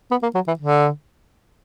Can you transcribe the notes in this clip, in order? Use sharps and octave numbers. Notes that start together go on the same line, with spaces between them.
B3
A#3
F#3
E3
D3